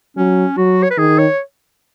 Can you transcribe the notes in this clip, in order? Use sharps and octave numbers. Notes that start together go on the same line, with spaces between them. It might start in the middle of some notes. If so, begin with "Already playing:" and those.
F#3 C#4
F#3 F#4
C#5
B4
D#3 G#4
C#5